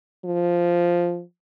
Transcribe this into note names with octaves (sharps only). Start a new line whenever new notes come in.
F3